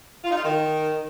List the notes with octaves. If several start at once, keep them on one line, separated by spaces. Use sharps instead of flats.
F4
D#4
F4
D#3